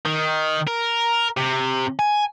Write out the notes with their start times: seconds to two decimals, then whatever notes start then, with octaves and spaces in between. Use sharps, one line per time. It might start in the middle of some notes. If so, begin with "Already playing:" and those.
0.05 D#3
0.67 A#4
1.37 C3
1.99 G#5